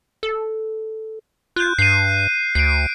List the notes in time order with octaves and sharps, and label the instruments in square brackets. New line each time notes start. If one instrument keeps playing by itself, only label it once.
[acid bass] A4
[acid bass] F4 [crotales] F#6 G6
[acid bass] G2 [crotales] C7 D#7
[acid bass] D2 [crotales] C7 D7